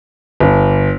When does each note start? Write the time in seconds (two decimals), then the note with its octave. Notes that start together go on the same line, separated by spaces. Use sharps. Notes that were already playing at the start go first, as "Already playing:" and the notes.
0.40 G1